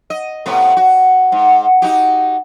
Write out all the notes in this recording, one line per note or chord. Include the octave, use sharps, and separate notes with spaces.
D#5
A2 C3 B3
F#4
G#2
D#4 F#4 G4